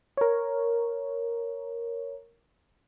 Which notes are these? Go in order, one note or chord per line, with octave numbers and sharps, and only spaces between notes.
A#4 C#5